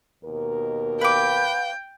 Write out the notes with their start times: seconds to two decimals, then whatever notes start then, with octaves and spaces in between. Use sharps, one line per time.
0.24 D#2 B2 A#4
1.01 B4 F5 G5 D6